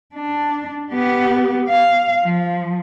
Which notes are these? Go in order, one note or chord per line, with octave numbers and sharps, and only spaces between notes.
D4
B3 G4
F5
F3